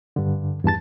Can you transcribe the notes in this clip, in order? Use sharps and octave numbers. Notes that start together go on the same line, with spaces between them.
G2 D3
E2 G2 A5 A6